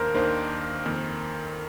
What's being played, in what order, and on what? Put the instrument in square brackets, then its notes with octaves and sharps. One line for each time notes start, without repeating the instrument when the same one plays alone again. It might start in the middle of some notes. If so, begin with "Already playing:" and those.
Already playing: [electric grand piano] D#2 D#3 A#3 D4 [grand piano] A#4 C5
[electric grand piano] D#2 D#3 A#3 D4 [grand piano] C5
[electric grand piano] F2 D#3 A#3